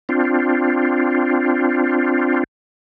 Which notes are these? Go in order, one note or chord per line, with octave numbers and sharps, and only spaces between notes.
C4 D4 F4